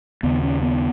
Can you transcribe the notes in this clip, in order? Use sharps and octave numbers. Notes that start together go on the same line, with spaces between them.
D#2 C#3 B3
C#4
B3